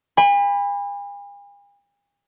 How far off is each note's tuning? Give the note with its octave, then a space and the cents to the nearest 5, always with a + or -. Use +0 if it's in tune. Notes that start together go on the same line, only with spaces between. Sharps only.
G#5 -45 B5 +0